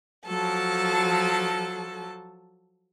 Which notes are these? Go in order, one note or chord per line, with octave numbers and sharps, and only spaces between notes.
F3 F#3 A4 A5